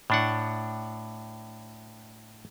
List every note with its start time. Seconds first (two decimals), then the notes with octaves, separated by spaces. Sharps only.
0.10 A2 D4 F#5